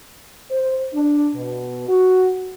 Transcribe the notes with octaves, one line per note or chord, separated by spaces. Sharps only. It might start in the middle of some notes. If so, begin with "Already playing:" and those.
C5
D4
B2
F#4